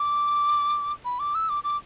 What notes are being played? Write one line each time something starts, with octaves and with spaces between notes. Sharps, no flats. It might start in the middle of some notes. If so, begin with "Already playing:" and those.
Already playing: D6
B5
D6
E6
D6
D6